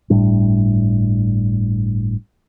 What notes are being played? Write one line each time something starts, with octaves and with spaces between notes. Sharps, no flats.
G1 A2 G3 D4